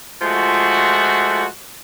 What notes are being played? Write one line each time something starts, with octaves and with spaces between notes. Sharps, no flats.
F3 G#3 A3 F4 F#4